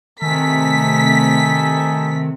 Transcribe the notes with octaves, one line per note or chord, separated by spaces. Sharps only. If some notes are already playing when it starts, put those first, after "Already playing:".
C3 D#3 A3 D#4 A4 G#5 B6